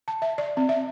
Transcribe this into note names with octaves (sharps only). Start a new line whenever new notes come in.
A5
E5
D5
C4
E5